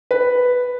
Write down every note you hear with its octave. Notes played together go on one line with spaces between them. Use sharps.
B4